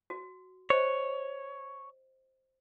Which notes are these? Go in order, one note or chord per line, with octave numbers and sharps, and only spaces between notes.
F#4
C5 C#5 D#5